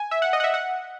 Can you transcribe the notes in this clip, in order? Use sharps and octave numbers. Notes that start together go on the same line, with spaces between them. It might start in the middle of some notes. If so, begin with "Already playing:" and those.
Already playing: G#5
E5
F#5
D#5
F#5
E5
F#5